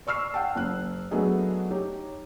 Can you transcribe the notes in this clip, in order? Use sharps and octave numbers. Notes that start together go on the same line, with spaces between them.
D5 C#6 E6 F6 C7
F#5 G5 A5
F#1 F#6
F#3 A3 B3 D4 G#4 D#5
D#4 G4 C#5